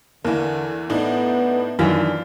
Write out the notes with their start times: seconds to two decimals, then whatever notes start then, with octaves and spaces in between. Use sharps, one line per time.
0.24 E2 D3 E3 A#3
0.90 A2 B3 D4 D#4
1.79 F#2 D#3 E3 D4 F4